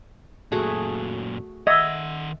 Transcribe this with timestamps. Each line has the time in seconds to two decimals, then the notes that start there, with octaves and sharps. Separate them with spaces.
0.52 F#2 A#2 A3 F#4 G#4
1.67 D#3 D#5 E5 F#5 E6 G#6